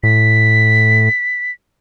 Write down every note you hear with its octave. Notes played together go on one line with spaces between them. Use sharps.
A2 B6